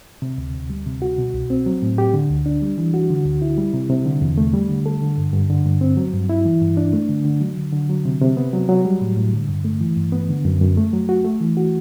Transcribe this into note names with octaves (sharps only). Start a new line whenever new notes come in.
C3
D2
D2
G3
C3
F#4
B2
C2
C4
F#3
A2
G4
D3
D2
D4
G3
E3
F#4
D3
D2
E4
G3
C3
C3
D3
E2
A3
G3
D3
A4
D3
G2
G2
D3
G2
C4
F#3
G2
E4
E3
G2
D4
A3
D3
D3
F#3
D3
D3
F#3
C3
C3
B3
F#3
F#3
G3
A2
A2
D3
G2
A3
E3
G2
B3
D3
F#2
F#2
A3
F#3
F#4
A3
E3
F#4